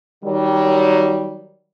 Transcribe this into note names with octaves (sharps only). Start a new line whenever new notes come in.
D#3 F#3 G3